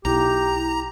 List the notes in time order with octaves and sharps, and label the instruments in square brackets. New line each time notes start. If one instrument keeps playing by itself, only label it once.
[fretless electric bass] B1 [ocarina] E4 [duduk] G4 [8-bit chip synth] A#5